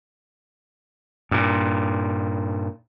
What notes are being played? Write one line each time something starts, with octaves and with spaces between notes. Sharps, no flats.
G2 A#2